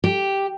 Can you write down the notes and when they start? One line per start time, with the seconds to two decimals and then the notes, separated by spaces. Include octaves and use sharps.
0.04 G4